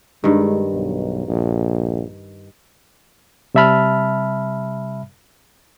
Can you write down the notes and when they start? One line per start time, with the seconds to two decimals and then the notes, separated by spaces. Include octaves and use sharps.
0.24 G2 D#3 G#3
0.73 B1
1.28 A#1
3.55 C3 G3 E5 A5 B5 F6